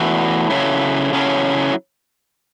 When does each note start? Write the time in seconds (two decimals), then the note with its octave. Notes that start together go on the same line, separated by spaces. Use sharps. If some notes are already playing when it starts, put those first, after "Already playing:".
Already playing: E2 E3 A3 F#4
0.50 C#3 F#3 C#4 E4 A4
1.13 C#3 F#3 C#4 E4 A4